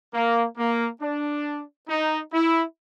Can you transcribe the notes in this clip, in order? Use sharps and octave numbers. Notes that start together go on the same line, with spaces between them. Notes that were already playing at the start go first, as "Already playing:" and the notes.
A#3
A#3
D4
D#4
E4